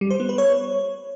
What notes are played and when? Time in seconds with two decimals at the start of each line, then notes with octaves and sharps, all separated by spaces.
0.01 G3
0.10 C5
0.20 B3
0.29 B4
0.38 C#5